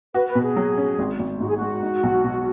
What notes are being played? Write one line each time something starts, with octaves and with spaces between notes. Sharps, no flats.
F#4 B4
B4
B2
G#4
F#3
C#4
G#1
G#1
G#2 F#4
G#4
G#3 F#4
D#4
B1
B2